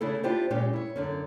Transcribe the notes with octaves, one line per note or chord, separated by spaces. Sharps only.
C#3 A3 D4 E4 G#4 A4
D4 E4 F4 G4 C5 D5
A#2 G#3 C#4 G4
E4 C#5
F#2 D3 C#4